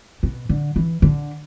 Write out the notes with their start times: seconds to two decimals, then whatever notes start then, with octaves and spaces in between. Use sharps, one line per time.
0.23 B2
0.49 D3
0.76 E3
1.02 D3